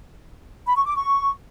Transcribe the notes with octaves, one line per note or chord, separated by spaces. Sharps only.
B5
C#6
D6
C#6